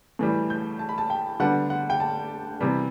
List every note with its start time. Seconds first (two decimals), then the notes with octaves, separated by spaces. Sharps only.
0.19 A2 E3 G3
0.50 G6
0.79 A5
0.89 B5
0.98 A5
1.10 G5
1.40 D3 G3 B3 D4 F#5
1.70 F#5
1.90 G5
2.00 A5
2.60 C3 E3 G3 B3